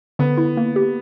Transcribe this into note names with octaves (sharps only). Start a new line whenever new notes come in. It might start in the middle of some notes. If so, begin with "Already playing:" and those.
D3 B3
E4
A#3
G4